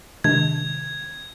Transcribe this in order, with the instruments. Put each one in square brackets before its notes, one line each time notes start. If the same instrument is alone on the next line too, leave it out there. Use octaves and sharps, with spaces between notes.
[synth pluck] C3 D#3 G#3 D4 [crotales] G#6